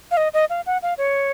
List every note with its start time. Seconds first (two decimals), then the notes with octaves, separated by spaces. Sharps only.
0.11 F5
0.17 D#5
0.34 D#5
0.50 F5
0.66 F#5
0.82 F5
0.98 C#5